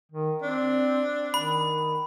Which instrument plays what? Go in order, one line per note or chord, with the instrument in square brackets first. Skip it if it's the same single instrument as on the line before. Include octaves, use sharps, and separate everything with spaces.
[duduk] D#3
[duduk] C4 [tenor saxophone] D4
[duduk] D#3 [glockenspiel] B5